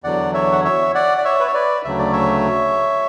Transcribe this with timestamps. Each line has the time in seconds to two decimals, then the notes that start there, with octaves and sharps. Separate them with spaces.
0.04 E2 D3 F#3 D5 F#5
0.34 C#5 E5
0.52 F#5
0.64 C#5 E5
0.95 D5 F#5
1.18 D5
1.25 C#5 E5
1.40 B4
1.47 C#5
1.54 B4 D5
1.85 D2 C#3 F#3 A3 E5
1.99 D5
2.13 C#5 E5